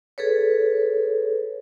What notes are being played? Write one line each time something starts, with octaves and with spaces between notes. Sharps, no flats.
G#4 A4 B4 C#5